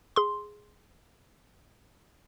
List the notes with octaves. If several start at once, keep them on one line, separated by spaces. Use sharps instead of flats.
G#4 C6